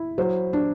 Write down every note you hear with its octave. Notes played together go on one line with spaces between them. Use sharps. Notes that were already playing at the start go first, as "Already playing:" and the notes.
Already playing: E4
F#3 C5
D4